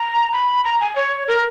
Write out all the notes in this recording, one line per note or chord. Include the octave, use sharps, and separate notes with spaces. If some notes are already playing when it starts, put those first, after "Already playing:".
Already playing: A#5
B5
A#5
G#5
C#5
A#4